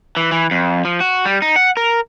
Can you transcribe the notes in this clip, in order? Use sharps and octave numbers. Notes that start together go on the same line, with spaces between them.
E3
E3
F2
F3
F#4
G3
D#4
F#5
A#4